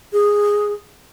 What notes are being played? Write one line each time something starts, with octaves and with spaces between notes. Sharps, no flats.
G#4